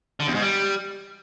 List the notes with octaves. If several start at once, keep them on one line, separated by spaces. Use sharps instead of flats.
D3
E2
G#2
G3